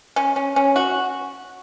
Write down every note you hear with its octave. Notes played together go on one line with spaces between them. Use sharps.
C#4
C#4
C#4
F#4